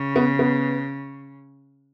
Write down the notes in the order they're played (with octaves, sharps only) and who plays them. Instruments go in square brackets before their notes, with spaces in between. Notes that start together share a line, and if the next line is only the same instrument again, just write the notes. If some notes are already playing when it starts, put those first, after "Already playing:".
Already playing: [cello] C#3
[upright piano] B3
B3